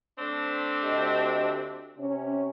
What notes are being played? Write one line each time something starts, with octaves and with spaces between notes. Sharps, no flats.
A3 C4 D4
D2 G4 D#5
C3 C#4